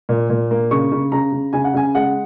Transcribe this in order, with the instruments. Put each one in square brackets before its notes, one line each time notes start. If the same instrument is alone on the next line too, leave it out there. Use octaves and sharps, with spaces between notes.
[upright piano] A#2
A#2
A#3
C#3 C#6
C#3
C#3 A#5
C#3
C#3 G#5
F#5
C#3 G#5
G#3 F#5